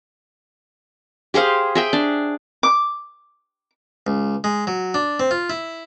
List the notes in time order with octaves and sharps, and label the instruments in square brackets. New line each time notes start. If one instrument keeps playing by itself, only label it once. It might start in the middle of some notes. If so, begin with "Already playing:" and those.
[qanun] G4 G#4 C5 F5
G#4 E5 G5
D4
[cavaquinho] D6
[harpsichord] C#2
G#3
F#3
D4
C4
F4
E4